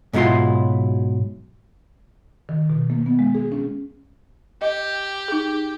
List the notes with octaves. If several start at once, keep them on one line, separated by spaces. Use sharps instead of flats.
G#2 B2 F#3 E4 F4 C6
D#3
B2
A#3
B3
G#3
G#4
C#4
G4 D#5
D#4 G#4